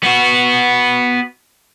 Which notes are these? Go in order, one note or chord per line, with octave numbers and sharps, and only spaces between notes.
B3 F#4